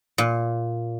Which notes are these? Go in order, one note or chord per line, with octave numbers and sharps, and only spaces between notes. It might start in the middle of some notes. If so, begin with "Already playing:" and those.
A#2